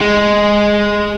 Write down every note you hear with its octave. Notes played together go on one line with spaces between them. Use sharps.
G#3